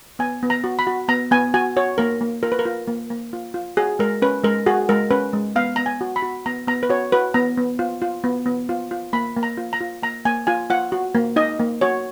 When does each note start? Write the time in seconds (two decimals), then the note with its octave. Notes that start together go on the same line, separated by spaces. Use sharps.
0.19 B3 G#5
0.43 B3
0.50 A#5
0.64 F#4
0.79 B5
0.87 F#4
1.08 B3 A#5
1.31 B3 G#5
1.54 F#4 G#5
1.76 F#4 C#5
1.98 A#3 A#4
2.21 A#3
2.43 F4 A#4
2.52 B4
2.59 A#4
2.66 F4
2.88 A#3
3.10 A#3
3.33 F4
3.54 F4
3.77 F#4 G#4
3.99 G#3 A#4
4.22 C#4 B4
4.44 G#3 A#4
4.66 F#4 G#4
4.89 G#3 A#4
5.11 C#4 B4
5.33 G#3
5.56 B3 F5
5.76 B3 A#5
5.86 G#5
6.01 F#4
6.16 B5
6.22 F#4
6.46 B3 A#5
6.68 B3 A#5
6.83 B4
6.90 F#4 C#5
7.12 F#4 B4
7.34 B3 A#5
7.57 B3
7.79 F4
8.02 F4
8.24 B3
8.46 B3
8.69 F4
8.91 F4
9.13 A#3 B5
9.36 A#3
9.43 A#5
9.57 F4
9.73 A#5
9.81 F4
10.03 A#3 A#5
10.25 A#3 G#5
10.47 F4 G#5
10.70 F4 F#5
10.92 F#4
11.15 A#3
11.36 D#4 D#5
11.60 A#3
11.81 F#4 C#5